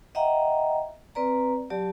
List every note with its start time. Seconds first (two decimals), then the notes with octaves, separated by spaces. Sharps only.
0.15 D#5 E5 F#5 G5 A#5
1.15 C4 B4 D5 A#5
1.70 F#3 G4 D5 A5